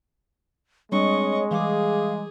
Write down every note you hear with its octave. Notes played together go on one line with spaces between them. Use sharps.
G3 G#3 C4 D4 C#5 D#5 C#6
E3 G3 G#4 F5 D6